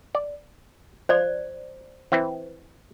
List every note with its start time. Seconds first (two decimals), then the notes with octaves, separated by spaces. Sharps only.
0.15 D5
1.09 F3 C5 D5
2.12 E3 C4 E4